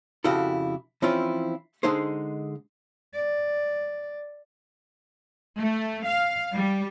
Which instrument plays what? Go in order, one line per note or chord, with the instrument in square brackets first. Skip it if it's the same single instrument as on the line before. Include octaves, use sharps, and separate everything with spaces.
[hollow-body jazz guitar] F2 C#3 E4 F#4 G4 A4
E3 F3 C4 C#4 E4 F4
D3 G#3 D#4 G#4 C5
[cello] D5
[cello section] A3
F5
G3